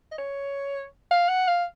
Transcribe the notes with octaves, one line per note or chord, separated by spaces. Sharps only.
D#5
C#5
F5
F#5
F5